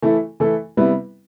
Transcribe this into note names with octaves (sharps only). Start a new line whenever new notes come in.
E3 A3 E4 A4
E3 A3 E4 A4
C3 G3 B3 E4 B4